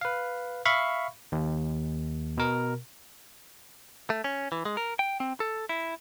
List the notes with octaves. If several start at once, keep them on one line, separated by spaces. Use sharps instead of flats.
B4 F5
E5 F5 B5 C#6
D#2
B2 A#4
A3
C#4
E3
G#3
A#4
G5
C4
A4
E4